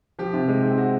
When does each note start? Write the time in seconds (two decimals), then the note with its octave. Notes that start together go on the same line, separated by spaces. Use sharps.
0.19 F3 G4
0.34 C3
0.48 G#3
0.63 C4
0.78 F#4